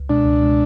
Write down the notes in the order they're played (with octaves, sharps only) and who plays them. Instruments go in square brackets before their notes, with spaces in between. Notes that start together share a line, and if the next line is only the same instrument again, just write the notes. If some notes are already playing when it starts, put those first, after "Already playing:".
Already playing: [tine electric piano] C#2
[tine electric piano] B2 G#3 [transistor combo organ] D4
[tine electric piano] C#2
B2 G#3